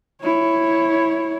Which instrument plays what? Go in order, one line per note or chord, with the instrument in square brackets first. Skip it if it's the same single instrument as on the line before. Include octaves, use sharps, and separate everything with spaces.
[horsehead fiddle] E4 C#5